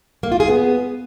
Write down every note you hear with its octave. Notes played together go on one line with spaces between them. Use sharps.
A#3
F4
G#4
B3